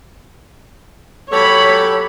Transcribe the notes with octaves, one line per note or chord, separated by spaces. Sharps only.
F#3 G4 A4 C#5 B5